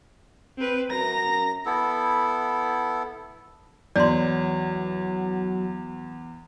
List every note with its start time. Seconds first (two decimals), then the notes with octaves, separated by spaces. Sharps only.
0.58 C4 B4
0.90 F#2 A#5 A#6
1.66 B3 E4 A4
3.96 E2 F#3 D5 C6